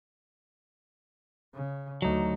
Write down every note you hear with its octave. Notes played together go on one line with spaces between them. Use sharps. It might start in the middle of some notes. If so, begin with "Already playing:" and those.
C#3
D2 F#3 A3 D#4